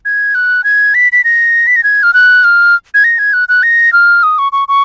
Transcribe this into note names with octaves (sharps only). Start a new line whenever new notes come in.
G#6
F#6
G#6
B6
B6
A#6
B6
A#6
G#6
F6
F#6
F6
G#6
A#6
G#6
F#6
F#6
A#6
F6
D#6
C#6
C#6
C#6